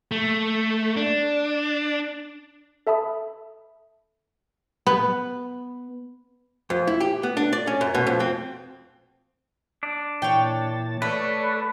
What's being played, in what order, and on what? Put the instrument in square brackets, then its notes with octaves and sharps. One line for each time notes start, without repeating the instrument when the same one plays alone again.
[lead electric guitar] A3
D4
[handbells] A4 E5 A5 B5 D#6
[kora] B3
[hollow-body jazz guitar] F2
E4
G4
B3
D4
D5
C#4
F#2
B2
F2
C4
[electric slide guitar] D4
[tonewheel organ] A#2 E3 A5 [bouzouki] C#5 G5
[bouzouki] A3 [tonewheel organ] A4 C#5 D5 [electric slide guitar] B4